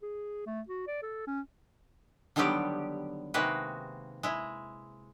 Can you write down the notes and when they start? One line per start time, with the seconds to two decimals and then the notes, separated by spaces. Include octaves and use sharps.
0.02 G#4
0.47 A3
0.69 F#4
0.87 D5
1.02 A4
1.27 C#4
2.36 D3 D#3 F#3 G3 B3 G4
3.34 C3 D#3 G#3 A#3 F#4 B4
4.23 G#3 E4